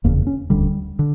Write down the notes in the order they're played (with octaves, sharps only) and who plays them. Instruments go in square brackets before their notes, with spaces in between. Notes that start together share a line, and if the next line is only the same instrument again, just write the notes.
[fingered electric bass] F1 E2 C#3 A#3
C#4
E1 D2 D3 G3
D3